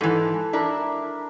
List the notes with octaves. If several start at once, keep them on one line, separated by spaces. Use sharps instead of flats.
G#2 E3 A4 A5
D4 E4 A#4